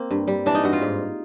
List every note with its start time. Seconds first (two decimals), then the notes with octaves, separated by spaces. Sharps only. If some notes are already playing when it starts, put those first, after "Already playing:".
Already playing: A#3 C4
0.11 G2
0.28 G3
0.46 E3 D4
0.55 D#4
0.64 G2 F#4
0.73 F4
0.82 G#2